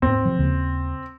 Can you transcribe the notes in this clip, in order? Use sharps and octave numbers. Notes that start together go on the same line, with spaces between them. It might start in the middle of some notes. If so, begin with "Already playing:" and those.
E2 G#2 C4
C3 F3
D#2 C#3